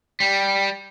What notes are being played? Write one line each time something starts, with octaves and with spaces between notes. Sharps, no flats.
G3